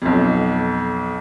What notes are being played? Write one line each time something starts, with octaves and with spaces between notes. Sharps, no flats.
B1 F2